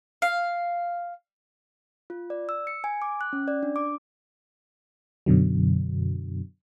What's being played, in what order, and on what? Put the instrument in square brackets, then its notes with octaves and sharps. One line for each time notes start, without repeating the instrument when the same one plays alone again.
[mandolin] F5
[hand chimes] F4
D5
E6
C#7
G#5
D6
F#6
C#4
D5
D4
D6
[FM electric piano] F#2 B2 D3 F#3